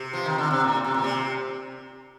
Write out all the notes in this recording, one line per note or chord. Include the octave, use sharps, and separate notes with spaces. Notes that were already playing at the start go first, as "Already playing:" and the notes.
Already playing: C3
F3
D#3
D3
C3
A#2
C3
A#2
C3